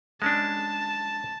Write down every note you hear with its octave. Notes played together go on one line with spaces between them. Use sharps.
G#3 C#4 D4 A5